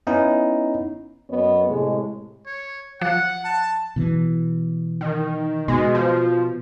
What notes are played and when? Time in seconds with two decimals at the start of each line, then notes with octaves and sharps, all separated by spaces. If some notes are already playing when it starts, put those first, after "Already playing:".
0.07 B3 C#4 D#4 E4
1.30 F#2 B3 C#5 D#5
1.67 A2 C3 G#3
2.46 C#5
3.01 F3 F#5
3.44 A5
3.96 B2 E3
5.01 D#3
5.68 B2 G#3
5.95 F3